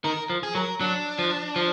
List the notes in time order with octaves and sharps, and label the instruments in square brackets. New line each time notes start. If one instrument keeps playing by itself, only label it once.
[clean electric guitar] D#3 [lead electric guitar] A#4
[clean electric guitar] F3
[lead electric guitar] G#4
[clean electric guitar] F#3 [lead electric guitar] A#4
[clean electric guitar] F#3 [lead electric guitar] D4
[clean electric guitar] F3
F3